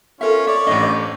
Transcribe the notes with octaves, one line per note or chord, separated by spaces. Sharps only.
C#4 F4 A4 A#4 E5
C#5 D5 E5
A1 A2 D4 D#5
C5